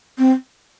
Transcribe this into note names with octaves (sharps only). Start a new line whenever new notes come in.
C4